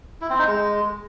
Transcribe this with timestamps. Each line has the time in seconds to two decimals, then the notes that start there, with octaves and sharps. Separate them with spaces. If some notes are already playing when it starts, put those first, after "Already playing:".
0.21 E4
0.30 C4
0.39 D#4
0.47 G#3